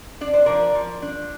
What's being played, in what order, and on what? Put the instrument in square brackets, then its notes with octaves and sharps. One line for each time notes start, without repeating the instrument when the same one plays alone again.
[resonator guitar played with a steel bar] D4 D5
C5
F3 A#4 D5
F3
D4